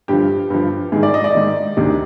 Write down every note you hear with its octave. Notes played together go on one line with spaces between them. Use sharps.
G2 D3 F3 G4
G2 D3 F3
G#2 D#3 G#4
D5
D#5
D5
G#2 D#3
D2 C3 D#3